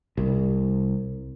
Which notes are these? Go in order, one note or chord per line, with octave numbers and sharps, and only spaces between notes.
C2